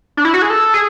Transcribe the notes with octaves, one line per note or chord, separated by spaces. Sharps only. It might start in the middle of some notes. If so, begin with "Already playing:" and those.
D4
E4
F#4
G#4
A4
G#4